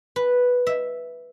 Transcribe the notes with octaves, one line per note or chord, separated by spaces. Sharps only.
B4
E5